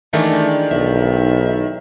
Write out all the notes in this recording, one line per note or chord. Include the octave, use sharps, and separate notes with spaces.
D#3 E3 G#3 A3 D4
B1 E5